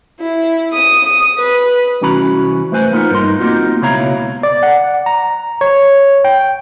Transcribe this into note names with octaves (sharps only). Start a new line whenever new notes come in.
E4
D#6
B4
C2 E3 C#4 F#4 A#5 B5
A3 B4 C5 G#5
A#3 B3 D#4 F4 A#4 B4
G2 D#4 A#4 C6
A#3 C4 D4 D#4 F4 F#4
C#2 B2 E4 C#5 F5 A#5
D5
F#5
A#5
C#5
G5